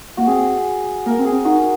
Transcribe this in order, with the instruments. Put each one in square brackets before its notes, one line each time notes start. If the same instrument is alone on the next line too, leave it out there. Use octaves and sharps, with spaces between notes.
[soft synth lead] A#3 [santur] F#4
[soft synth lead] C4 [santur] G#4
[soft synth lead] A#3 [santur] A#4
[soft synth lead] C4
[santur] G#4
[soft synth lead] C4
[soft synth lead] D#4 [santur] F#4